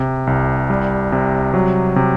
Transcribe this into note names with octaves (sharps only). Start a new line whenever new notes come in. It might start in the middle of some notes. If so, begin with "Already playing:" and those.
Already playing: C3
C2
G3
C3
F#3
C3